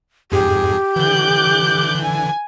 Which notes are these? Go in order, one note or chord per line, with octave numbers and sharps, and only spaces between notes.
F2 G#2 G4 G#4
D3 E3 D6 F#6 G6
G#5